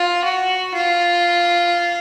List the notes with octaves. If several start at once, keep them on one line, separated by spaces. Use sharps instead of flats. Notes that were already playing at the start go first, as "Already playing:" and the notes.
Already playing: F4
F#4
F4